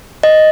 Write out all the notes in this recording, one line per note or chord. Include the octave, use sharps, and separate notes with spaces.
D#5